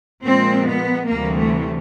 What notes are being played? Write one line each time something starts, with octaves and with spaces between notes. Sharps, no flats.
A#2 F3 G#3 C4
B3
D2 C3 E3 G3 A#3
A3